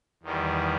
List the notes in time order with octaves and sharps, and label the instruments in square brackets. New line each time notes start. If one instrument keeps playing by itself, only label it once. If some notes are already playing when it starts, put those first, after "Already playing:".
[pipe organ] E2 D#3 G3